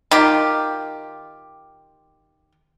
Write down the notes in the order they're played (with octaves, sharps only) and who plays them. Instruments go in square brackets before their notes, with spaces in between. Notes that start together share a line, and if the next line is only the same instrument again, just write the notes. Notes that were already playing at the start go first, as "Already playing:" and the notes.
[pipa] D#3 F4 G4